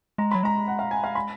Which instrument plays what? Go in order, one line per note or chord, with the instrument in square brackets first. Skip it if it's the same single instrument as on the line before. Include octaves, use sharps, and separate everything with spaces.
[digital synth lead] G#3 [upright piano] A#5
[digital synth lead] F#3 [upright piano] B5
[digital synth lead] G#3 [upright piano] A#5
[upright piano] F#5
F5
G#5
F5
B5